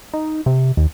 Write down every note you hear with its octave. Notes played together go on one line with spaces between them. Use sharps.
D#4
C3
D#2